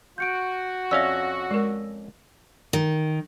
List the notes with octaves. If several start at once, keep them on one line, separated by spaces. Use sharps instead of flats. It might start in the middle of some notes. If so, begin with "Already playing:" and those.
F#4 G6 C#7 D7
F2 C#4 D5 E5 F5 E6 A#6
G#3 A#4
D#3